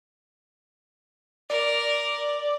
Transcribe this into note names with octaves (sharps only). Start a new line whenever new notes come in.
A#4 D5